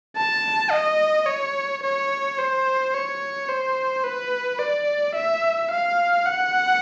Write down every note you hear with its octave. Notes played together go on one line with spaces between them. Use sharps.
A5
D#5
C#5
C#5
C5
C#5
C5
B4
D5
E5
F5
F#5